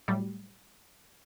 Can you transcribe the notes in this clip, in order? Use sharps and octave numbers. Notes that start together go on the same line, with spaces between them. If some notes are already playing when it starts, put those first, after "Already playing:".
A2 F#3 G3